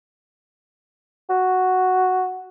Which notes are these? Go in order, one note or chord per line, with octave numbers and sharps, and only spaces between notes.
F#4